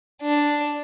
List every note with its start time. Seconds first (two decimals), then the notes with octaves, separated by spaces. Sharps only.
0.22 D4